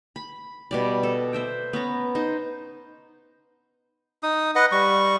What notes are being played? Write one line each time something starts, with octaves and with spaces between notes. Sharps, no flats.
B5
B2 G3 D5
A4
C5 E5 G5
B3 C#4 A#5
D#4 C5
D#4 D#6
B4 D#5 F#5
G3 C#6